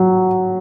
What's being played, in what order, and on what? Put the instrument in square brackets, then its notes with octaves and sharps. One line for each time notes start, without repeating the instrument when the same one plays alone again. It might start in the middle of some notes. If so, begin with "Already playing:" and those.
Already playing: [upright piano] F#3